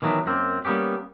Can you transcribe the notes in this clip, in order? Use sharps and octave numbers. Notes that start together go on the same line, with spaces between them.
D#3 E3 F#3 A3 B3 D4
F#2 A#3 C4
G3 A#3 B3 C#4 G4